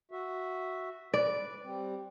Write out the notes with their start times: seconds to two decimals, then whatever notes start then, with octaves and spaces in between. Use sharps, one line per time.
0.11 F#4 E5
1.14 B4 D5
1.63 G3 C4